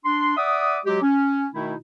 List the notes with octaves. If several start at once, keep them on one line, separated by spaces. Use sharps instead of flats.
D4 C6
D5 E5 F#5 D6 D#6
F#3 G#3 F#4 G4
C#4
B2 D#3 A3 D#4 E4